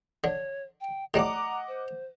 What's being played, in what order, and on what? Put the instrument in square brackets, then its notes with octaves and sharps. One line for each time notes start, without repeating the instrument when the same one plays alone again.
[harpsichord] D3 [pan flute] C#5
[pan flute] G5
[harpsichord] A2 G3 A3 [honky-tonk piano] D#5 F#5 D6 [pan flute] A#5
[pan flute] C5